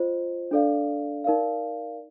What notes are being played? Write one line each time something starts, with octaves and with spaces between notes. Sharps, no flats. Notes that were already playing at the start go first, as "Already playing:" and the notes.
Already playing: F4 C5 D#5
D4 A4 D5 F5
D#4 A#4 D5 F5